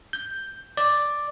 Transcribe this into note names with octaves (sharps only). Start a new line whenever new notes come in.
G6
D5